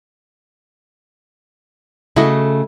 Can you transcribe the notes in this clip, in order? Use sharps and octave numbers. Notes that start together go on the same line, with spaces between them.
C#3 A3 E4 F#4 D#5